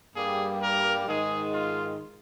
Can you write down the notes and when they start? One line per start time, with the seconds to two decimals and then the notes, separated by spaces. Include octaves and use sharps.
0.13 G2 G3 A#3 G#4
0.60 A#4
1.06 G#2 D#3 G#3 G#4
1.53 F4